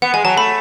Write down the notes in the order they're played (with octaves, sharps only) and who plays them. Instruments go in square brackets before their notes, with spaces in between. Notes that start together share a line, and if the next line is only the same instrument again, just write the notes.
[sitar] B3 [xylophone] F#5
[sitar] G#3 [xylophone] G#5
[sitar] F#3 [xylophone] A5
[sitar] A3 [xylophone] B5